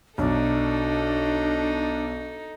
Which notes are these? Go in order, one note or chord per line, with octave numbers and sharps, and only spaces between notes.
B1 D4 D#4 A4